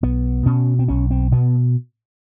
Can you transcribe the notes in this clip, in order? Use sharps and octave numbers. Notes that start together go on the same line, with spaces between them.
B1 B3
B2 C#4
C4
B1 C#4
C4
B2 B3